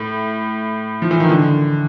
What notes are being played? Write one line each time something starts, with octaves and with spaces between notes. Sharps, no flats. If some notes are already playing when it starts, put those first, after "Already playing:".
Already playing: A2
F3
E3
D#3
D3